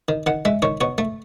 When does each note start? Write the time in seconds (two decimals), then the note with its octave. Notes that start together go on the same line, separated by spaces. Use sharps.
0.08 D#3
0.26 D#3 F#5
0.45 G#3 E5
0.62 D#3 C#5
0.81 B2 C#5
0.98 A3